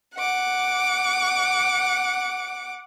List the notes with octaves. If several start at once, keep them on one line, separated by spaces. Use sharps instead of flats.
F#5 D6